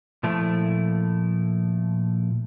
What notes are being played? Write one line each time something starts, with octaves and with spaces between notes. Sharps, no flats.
A#2 F3 A3 E4